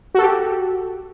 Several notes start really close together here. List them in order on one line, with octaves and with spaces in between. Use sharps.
F#4 A4 G4